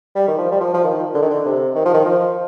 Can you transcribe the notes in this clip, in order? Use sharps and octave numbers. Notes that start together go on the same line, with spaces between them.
G3
D#3
F3
G3
F3
F3
D#3
D3
D#3
D3
C3
D#3
F3
D#3
F3